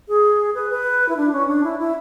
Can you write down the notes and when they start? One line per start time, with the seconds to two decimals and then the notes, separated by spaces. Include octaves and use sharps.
0.08 G#4
0.54 B4
0.70 B4
1.09 E4
1.17 D4
1.32 C#4
1.48 D4
1.64 E4
1.79 E4